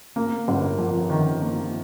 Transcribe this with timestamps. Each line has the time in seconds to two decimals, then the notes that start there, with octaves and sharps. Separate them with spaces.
0.16 A#3
0.48 G1
0.79 F2
1.10 D#3
1.42 A#3